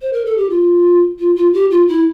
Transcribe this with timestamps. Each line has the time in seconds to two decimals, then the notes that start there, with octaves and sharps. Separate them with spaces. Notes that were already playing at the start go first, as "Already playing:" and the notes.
0.01 C5
0.13 A#4
0.26 A4
0.38 G4
0.50 F4
1.19 F4
1.36 F4
1.54 G4
1.71 F4
1.88 E4